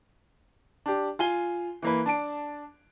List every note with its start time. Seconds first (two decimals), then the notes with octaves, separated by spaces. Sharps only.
0.86 D4 G4
1.19 F4 G#5 G7
1.82 E3 A#3 B4
2.06 D4 A5 D7